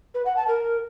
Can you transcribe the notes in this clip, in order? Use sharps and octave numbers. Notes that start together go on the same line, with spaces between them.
B4
F#5
A5
A#4